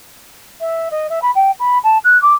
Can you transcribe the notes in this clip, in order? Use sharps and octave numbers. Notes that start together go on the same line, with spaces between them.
E5
D#5
E5
B5
G5
B5
A5
F#6
D6